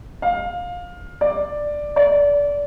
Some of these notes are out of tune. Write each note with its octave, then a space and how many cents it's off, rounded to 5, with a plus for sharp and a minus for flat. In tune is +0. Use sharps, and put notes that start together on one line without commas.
F5 +20
D5 +5
D5 -25